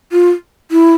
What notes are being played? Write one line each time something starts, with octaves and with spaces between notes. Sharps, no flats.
F4
E4